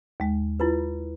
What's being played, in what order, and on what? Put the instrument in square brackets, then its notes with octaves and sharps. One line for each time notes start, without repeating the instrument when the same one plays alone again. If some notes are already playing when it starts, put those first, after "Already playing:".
[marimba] D#2 G#3
[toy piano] E4 F4 B4